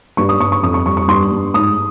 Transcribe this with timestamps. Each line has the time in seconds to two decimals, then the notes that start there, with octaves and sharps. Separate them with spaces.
0.17 G2 C#6
0.29 D#6
0.40 G2 C#6
0.52 C#6
0.63 F2 D#6
0.74 C#6
0.86 G3 C#6
0.97 C#6
1.08 G2 C6
1.32 G2
1.54 G#2 D#6